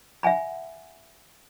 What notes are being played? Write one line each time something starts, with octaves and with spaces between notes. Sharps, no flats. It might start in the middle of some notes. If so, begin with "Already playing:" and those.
E5 F#5 G#5 B5